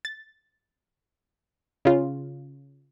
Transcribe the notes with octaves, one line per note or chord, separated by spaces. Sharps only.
A6
C#3 F4